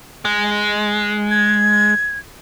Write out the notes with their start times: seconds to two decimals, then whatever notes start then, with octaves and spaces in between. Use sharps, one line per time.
0.25 G#3
1.31 G#6